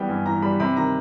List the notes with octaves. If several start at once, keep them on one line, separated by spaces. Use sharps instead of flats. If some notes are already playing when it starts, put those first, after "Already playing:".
Already playing: E3 G3 B3 G5
G2 G#5
E3 A#5
G3 B5
C3 B5
D#3 A#5